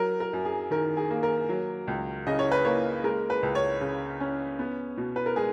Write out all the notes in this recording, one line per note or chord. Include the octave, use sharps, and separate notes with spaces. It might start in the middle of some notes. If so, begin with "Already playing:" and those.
Already playing: F#3 A#4
A#4
F#2
G#4
D#3 A#4
G#4
A#3
A#4
F#3
C#2
C#3 D#5
C#5
B4
A#3 C#5
G#3 A#4
B4
C#2
C#5
C#3
C#4
B3
B2
B4
A#4
G#3 G#4